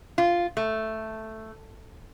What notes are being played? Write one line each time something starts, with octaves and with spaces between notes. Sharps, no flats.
F4
A3